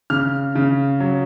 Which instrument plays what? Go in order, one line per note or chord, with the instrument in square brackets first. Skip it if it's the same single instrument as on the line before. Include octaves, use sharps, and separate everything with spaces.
[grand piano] C#3 F6
C#3
F#3